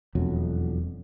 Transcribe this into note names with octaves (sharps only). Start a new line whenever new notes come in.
E1 F2 F#3